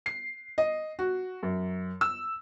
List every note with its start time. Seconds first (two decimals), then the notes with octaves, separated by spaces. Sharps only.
0.06 C7
0.58 D#5
0.99 F#4
1.43 F#2
2.01 E6